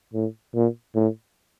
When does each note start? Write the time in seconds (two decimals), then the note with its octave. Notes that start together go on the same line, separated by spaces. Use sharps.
0.14 A2
0.54 A#2
0.95 A2